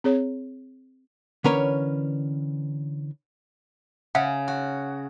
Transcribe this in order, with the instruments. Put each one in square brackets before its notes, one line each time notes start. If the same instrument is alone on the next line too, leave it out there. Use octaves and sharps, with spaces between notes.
[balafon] C4 G#4 C#5
[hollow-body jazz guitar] D3 E3 C#4 A#4 B4 C#5
[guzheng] C#3 [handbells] E5 F#5
[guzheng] F#4